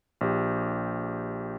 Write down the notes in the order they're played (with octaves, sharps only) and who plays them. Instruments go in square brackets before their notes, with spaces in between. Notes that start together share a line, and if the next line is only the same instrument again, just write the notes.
[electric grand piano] A#1 G4